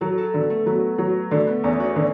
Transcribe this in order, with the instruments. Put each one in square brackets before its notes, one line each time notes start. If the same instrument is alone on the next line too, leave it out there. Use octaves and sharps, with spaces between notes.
[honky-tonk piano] F#3 [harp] A4
[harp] A4
[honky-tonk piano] D3 [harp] B3
[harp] A3
[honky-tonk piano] F#3 [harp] B3
[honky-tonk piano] F#3
[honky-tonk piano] D3 [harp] A3
[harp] B3
[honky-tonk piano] E2 [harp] C#4
[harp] F#4
[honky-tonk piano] D3